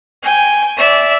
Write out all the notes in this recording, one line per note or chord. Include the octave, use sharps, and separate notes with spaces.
G5 G#5
D5 E5